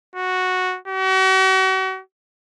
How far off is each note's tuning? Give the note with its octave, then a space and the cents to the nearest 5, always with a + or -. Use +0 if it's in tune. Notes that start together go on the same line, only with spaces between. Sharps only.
F#4 -5
F#4 +40